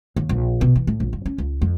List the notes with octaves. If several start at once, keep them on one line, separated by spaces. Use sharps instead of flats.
D#2
A#1
B2
E3
A2
A#1
G2
C#4
C#2
F2